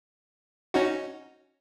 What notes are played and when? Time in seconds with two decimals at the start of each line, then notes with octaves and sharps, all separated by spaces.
0.74 C#4 D#4 F#4